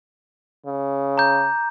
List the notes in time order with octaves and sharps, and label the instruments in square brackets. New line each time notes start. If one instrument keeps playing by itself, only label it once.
[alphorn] C#3
[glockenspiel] A#5 D6 G6